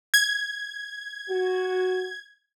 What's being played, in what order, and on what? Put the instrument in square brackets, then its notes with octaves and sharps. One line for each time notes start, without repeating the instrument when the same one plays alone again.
[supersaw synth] G#6
[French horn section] F#4